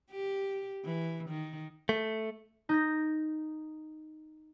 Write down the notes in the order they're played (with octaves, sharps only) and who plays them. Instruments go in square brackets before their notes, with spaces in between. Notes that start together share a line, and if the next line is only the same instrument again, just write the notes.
[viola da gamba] G4
E3
D#3
[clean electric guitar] A3
[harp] D#4 G6 A#6